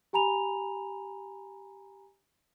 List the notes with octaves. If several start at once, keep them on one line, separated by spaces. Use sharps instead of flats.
G4 G#5 A#5 B5 F7